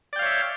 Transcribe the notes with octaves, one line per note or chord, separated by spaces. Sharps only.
C#5 D5 E5 F5 G5